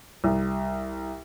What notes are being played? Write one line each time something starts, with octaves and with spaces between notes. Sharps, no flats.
C2